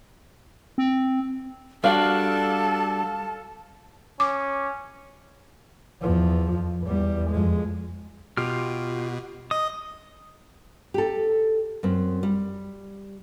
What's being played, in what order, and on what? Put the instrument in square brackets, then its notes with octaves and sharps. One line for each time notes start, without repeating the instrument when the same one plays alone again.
[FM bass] C4
[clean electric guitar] G3 D4 F#4 [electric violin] A4 [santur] F5 [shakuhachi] A5
[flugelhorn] C#4 [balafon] D6
[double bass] E2 F3
F2
E2 G3
F2 G#3
[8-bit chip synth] B2 [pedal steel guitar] F4 G4 F6
[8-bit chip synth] D#5 [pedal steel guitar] D#6
[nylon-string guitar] G4 A4
F#2 C4
G3